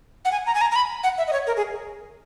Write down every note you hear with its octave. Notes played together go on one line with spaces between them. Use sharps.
F#5
G#5
A#5
G#5
A#5
A#5
B5
F#5
E5
D#5
C#5
A#4
G#4